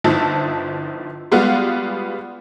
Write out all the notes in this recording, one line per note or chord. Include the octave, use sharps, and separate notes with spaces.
G1 F3 D#4 E4 A5
G3 G#3 B3 F4 F#4